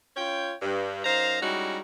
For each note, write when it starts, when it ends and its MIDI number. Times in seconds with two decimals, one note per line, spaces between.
0.17 0.54 61
0.17 0.54 65
0.17 0.54 73
0.17 0.54 79
0.62 1.02 43
1.05 1.41 42
1.05 1.41 63
1.05 1.41 72
1.05 1.41 77
1.05 1.41 82
1.42 1.80 55
1.42 1.80 56
1.42 1.80 61
1.42 1.80 63
1.42 1.80 64
1.42 1.80 66